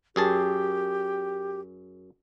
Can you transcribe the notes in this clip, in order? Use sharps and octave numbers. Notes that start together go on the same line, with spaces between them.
F#2 G4 G#4 A5